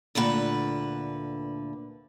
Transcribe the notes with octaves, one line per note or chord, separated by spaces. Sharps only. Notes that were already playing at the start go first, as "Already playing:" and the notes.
D2 A#2 D3 B4 F#5